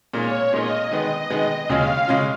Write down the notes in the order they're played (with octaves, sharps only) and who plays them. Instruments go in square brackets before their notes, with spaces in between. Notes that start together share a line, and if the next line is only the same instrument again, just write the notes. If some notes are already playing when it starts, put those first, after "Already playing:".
[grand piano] A#2 G#3 D#4 A#4 [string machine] C#5
[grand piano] A#2 G#3 D#4 A#4 [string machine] D#5
[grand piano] D#3 G#3 B3 [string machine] D#5
[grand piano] D#3 G#3 B3
[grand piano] D#2 C#3 G#3 C#4 F4 [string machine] F5
[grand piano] C#3 G#3 C#4 F4